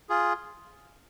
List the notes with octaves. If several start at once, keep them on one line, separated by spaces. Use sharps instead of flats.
F4 G#4